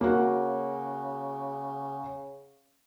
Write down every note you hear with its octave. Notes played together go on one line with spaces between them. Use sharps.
C#3 A#3 F#4